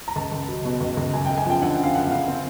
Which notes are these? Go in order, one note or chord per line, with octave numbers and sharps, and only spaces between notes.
A#5
C#2 A5
C#2
F#3
B2
C#2
C#2
F#2 G#5
G5
F#2
G#5
F3 G5
D3 F#5
F#2 F5
F#2 F#5
C#3 F5
C4